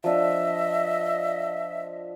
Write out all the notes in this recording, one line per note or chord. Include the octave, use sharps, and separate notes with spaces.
F3 D4 D#5 E5